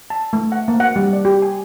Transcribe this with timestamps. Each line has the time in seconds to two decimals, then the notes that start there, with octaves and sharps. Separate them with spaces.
0.10 A5
0.33 A3
0.52 F#5
0.68 A#3
0.80 F#5
0.96 G3
1.13 D5
1.25 G4
1.42 G#5